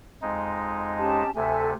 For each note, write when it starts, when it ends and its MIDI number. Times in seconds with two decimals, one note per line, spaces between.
0.22 1.23 41
0.22 1.23 56
0.22 1.23 63
0.98 1.30 61
0.98 1.30 67
0.98 1.30 81
1.35 1.74 38
1.35 1.74 48
1.35 1.70 69
1.35 1.70 76
1.35 1.70 80